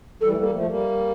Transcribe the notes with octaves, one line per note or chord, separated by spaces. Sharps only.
E3 G3 A4
A3
G3 A#3
F3 A3
G3 A#3